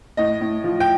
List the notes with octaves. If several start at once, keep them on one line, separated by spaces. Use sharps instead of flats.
A2 D#5
A2
F3
G5